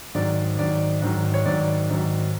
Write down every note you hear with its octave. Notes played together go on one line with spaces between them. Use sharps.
G#2 D#3 F#3 D5
G#2 D#3 F#3 D5
G#2 D#3 F#3
C#5
G#2 D#3 F#3 D5
G#2 D#3 F#3